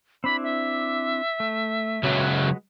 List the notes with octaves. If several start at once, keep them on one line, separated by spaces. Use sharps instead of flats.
C4 D4 E4 B5
E5
A3
C#2 F#3 G#3 F#4 B4